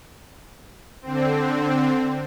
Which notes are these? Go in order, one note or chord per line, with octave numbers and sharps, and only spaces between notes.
D3 C4